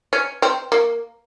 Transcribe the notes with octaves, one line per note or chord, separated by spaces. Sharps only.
C#4
C4
A#3